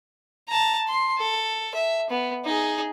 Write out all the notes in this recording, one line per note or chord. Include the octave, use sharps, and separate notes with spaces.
A5 A#5
C6
A4
E5
B3
D#4 G#4